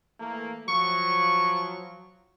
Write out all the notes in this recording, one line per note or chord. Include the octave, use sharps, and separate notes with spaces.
E3 A3 A#3
F3 F#3 C#6